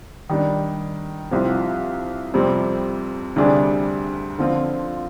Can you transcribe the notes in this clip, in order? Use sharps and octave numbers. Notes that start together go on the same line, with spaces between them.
D#3 G3 D4
C2 C3 F3 C4
F2 C3 G3 C4
D2 C3 G3 D4 G#4
D3 F3 C4 F4